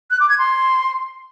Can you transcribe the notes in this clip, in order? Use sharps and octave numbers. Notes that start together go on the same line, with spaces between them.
F#6
D6
G#6
C6